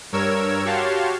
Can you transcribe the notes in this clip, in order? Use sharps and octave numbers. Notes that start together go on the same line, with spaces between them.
G2 A#4 C#5 E6 G#6
F#4 G4 C#5 F5 A5 C6